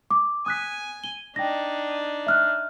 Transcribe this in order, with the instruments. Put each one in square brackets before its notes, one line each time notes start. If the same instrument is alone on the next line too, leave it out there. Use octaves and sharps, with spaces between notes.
[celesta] D6
[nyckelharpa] G#5 [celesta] D#6 F#6 B6
[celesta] G7
[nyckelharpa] D4 D#4 [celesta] G5 A#6
[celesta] E5 F6 F#6